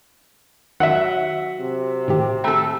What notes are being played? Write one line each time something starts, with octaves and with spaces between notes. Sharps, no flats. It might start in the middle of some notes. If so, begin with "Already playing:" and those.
D#3 F#3 E5 F#5 D#7
C3
A2 D#3 G4
A3 A4 G5 A#5 B5